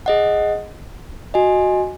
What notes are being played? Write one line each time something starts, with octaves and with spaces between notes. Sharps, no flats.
G#4 D#5 F#5
F#4 D#5 G#5